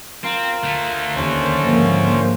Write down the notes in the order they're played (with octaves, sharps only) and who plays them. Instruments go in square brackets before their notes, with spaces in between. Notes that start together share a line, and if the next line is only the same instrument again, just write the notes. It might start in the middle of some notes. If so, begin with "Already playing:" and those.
[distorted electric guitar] C4 [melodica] F4 A#4
[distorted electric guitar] D3 A3
[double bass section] D#2 [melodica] C#4 C5
[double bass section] G#2 F3 A#3